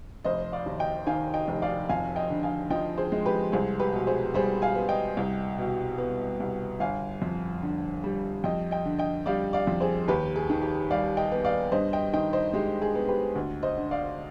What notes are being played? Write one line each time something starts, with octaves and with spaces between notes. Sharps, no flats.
F1 C5 D#5
D5 F5
D#2
D#5 G5
D#3 F5 G#5
D#5 G5
F1
D5 F5
F2 F5 G#5
D#5 G5
D3
F5 G#5
F3 D#5 G5
G#4 C5
G#3
G4 B4
C2 G#4 C5
G4 B4
B2
G#4 C5
G3 G#4 C5
F5 G#5
B3
D#5 G5
C2
B2
B3
C2
G1 F5 G#5
F2
D3
G3
F2 D#5 G5
D#5 G5
D3
D#5 G5
G3 D5 F5
D5 F5
F2
G#4 C5
D#2 G4 B4
G#4
D#3
G4
G3 D5 F5
D#5 G5
B3
D5 F5
G2 C5 D#5
D#5 G5
D#3 D#5 G5
C5 D#5
G#3 G4
G#4
B3
G4 B4
D2
C5 D#5
D3
D5 F5